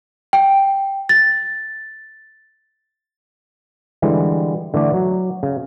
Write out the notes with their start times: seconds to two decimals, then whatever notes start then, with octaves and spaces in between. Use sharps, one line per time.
0.33 G5
1.09 A6
4.02 D3 E3 G3 G#3
4.74 D3 E3 A3 D4
4.94 F#3
5.43 C#3